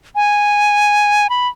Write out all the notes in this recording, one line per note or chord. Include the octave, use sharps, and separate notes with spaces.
G#5
B5